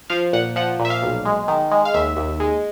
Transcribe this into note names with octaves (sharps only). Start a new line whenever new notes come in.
F3 F5
A#2 F#5
F3 F#5
A#2
E5
F5
B1
G#3
D#3
G#3
F5
D#2 E5
D#2
G#3